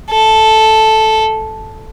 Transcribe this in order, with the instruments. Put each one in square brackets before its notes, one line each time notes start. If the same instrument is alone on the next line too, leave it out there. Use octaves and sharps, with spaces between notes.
[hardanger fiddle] A4